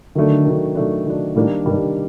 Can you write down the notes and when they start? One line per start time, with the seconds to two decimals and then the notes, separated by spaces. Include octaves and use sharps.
0.15 D3 D#3 F#3 A3 D4
0.45 D#3 F#3 A3 D4
0.75 D#3 F#3 A3 D4
1.06 D#3 F#3 A3 D4
1.36 A2 D#3 G3 A#3 D4
1.66 G2 D#3 G3 A#3 D4